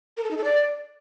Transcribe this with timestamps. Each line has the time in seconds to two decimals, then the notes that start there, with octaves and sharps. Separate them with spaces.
0.17 A#4
0.24 A4
0.31 D#4
0.37 A4
0.44 D5